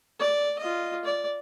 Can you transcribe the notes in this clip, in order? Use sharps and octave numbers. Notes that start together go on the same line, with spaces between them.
D5
F4 D#5
D5